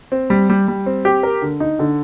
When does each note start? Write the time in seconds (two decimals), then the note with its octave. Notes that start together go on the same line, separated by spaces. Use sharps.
0.12 C4
0.30 G3
0.50 G3
0.68 G3
0.86 C4
1.05 G4
1.23 A#4
1.42 D3
1.60 D#4
1.79 D3